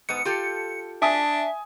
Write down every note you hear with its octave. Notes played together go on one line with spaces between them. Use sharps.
G#2 B3 C#7
F4 G4 A4
D4 E5 G#5 A5 D#6